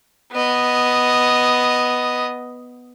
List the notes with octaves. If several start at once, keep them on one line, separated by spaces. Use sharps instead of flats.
B3 D#5